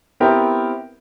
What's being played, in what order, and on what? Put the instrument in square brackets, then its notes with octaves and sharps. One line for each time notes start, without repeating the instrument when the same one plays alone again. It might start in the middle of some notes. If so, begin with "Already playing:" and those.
[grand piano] B3 C4 E4 G4 A#4